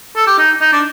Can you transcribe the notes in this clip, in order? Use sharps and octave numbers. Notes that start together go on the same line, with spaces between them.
A4
G4
D#4
D#4
D4